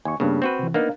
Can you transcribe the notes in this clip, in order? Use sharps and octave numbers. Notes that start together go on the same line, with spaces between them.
D#2 G#5 C#6
G2 C#3 A#3 B3 D4
C4 F#4 B4
C3 E3
A#3 B3 D4 D#4 A#4 F5